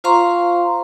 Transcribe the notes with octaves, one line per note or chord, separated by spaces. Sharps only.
F4 C5 F5 A#5 C6 C#6